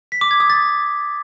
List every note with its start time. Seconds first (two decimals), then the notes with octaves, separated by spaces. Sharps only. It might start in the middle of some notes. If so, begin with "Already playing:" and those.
0.12 B6
0.21 D6
0.31 G#6
0.40 D#6
0.50 A6